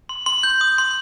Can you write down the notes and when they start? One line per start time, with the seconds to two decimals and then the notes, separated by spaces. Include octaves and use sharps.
0.09 C6
0.26 C6
0.43 G6
0.61 D#6
0.78 C6